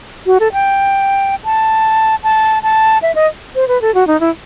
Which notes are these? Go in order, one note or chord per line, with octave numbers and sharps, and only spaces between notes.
F#4
A4
G5
A5
A5
A5
E5
D#5
C5
B4
A4
F#4
D#4
E4